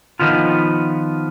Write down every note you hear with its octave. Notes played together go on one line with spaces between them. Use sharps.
D#3 F3 B3 F4